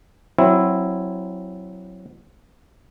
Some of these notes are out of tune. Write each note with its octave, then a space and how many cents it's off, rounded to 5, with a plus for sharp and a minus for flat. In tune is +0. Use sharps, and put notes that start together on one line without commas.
F#3 +0 C4 +15 E4 +0